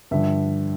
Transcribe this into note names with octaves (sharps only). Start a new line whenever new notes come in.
G2 D3 F3 E5